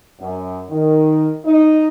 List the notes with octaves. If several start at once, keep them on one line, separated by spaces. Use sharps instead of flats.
F#2
D#3
D#4